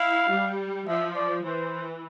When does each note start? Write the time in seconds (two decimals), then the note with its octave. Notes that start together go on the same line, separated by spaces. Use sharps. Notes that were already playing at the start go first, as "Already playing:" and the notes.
Already playing: E4 F5
0.30 G3
0.87 F3 E5
1.16 D5
1.44 E3 C5